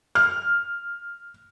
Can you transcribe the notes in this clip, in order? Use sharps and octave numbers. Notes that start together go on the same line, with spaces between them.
F6